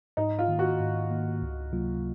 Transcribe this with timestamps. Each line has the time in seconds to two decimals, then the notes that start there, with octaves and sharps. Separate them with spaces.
0.17 G#2 D#4
0.39 F4
0.48 D#3 A#3
0.59 F#4
0.80 G#2
1.11 D#3 A#3
1.42 C#2
1.72 C3 F#3 A#3 F4